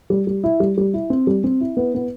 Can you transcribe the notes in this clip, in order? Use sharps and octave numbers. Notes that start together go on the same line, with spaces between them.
G3
G3
E4
G3
G3
E4
C4
G3
C4
E4
B3
B3